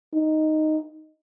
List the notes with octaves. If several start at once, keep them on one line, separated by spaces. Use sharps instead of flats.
D#4